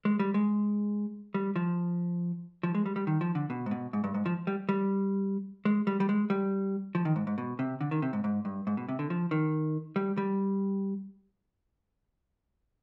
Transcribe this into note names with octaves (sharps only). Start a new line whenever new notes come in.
G#3
G3
G#3
G3
F3
F3
G#3
G3
G3
D#3
F3
D3
B2
G#2
B2
G#2
G2
G#2
F3
G3
G3
G#3
G3
G3
G#3
G3
F3
D#3
G#2
G#2
B2
C3
D3
D#3
C3
G#2
G#2
G2
G#2
B2
C3
D3
F3
D#3
G3
G3